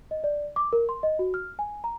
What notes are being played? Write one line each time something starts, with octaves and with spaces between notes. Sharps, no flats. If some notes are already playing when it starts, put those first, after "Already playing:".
D#5
D5
D6
A#4
C6
D#5
F#4
F6
G#5
A#5